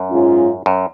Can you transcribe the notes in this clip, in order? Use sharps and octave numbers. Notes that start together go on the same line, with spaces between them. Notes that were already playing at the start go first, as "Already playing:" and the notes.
Already playing: F#2
G#2 G#3 C#4 F4
F#2